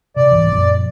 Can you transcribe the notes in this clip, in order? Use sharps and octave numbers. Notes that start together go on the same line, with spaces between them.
C3 D5
C2 G#2 E3
F#2 A#2 F3